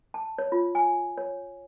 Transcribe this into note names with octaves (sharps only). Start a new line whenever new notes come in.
A5
C#5
F4
G#5
C#5